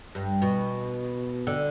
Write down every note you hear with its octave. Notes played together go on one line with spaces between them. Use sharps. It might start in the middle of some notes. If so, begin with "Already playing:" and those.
G2
B2
D3